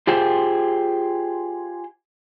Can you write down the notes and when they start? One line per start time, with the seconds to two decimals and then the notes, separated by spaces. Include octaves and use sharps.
0.07 F4 G4 G#4 C5 G5